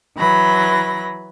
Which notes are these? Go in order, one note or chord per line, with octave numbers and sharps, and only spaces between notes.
E3 F#3 B5 A#6